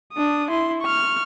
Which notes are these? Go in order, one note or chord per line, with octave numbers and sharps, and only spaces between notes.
D4 D#6
E4 C6
C#6 F6